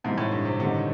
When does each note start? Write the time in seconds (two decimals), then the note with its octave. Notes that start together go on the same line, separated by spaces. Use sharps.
0.04 G#2 C3 E3 G3 C4
0.18 A2
0.31 G2
0.45 C3
0.59 D3 D#3 G3 C4 D#4